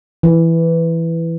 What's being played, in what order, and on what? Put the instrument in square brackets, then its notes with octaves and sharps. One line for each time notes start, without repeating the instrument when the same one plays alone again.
[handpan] E3